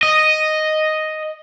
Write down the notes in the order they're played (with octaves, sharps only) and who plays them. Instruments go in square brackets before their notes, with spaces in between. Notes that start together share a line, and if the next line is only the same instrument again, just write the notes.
[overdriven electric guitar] D#5